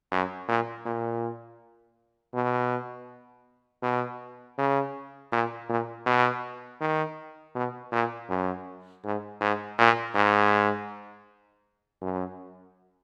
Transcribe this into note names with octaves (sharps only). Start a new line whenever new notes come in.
F#2
A#2
A#2
B2
B2
C#3
A#2
A#2
B2
D#3
B2
A#2
F#2
G#2
G#2
A#2
G#2
F#2